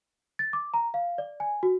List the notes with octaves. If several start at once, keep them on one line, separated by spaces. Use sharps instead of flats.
A6
D6
A#5
F5
D5
G#5
F#4